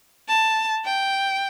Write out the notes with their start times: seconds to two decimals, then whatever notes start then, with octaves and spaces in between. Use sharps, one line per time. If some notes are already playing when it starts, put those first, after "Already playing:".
0.29 A5
0.85 G5